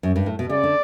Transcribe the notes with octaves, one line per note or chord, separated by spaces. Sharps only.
F#2
G2
A2
B2
C#3 D5
D3